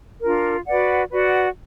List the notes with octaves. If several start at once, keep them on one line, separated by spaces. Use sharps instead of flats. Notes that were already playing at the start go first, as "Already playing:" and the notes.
D4 F4 A#4
F#4 B4 D5 F#5
F#4 B4 D5 F#5